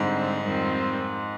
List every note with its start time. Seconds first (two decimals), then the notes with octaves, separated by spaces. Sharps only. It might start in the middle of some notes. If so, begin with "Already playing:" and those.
Already playing: G#2 D3 G3 C4
0.43 F2 D#3 G3 C4 F4